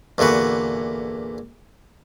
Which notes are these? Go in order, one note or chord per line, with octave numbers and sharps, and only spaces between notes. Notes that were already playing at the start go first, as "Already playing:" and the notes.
E2 A#2 D3 F#4 B4